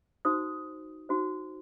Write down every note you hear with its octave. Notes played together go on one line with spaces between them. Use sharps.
D#4 F#4 C5 D#6
D#4 F#4 C5